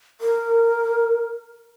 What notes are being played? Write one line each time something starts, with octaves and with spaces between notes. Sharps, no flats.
A#4